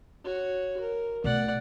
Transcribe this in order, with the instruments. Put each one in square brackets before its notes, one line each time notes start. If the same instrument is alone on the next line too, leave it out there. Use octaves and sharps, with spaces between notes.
[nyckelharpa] F#4 C#5
A#4
[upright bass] B2 A3 [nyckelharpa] D5 F#5